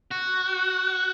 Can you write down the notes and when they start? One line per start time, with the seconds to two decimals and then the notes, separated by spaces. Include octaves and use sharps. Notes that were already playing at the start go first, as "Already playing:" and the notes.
0.11 F#4